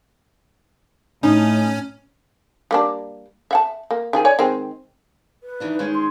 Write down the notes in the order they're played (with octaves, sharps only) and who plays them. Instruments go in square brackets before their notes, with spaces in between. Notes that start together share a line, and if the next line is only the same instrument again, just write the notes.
[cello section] A2 [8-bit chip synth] C#4 [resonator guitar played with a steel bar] D#4
[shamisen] G3 A#3 D4
E5 F#5 A5
A#3
D#3 F3 G#4
C#5 D5 G#5
D#3 G#3 C4
[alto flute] B4
[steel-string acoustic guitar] D#3 E3 D4
D#3 G#3 C#4
[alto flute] C6